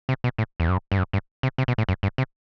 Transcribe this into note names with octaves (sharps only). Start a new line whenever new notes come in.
C3
B2
A2
E2
F#2
G2
F#2
G2
C3
C3
B2
A2
F#2
G2
C3